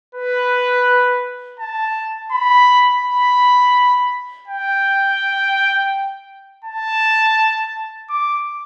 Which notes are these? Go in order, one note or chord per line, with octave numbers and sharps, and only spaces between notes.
B4
A5
B5
B5
G5
A5
D6